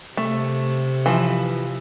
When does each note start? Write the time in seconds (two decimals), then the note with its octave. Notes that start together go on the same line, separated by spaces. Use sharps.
0.17 C3 A3
1.06 E3 F3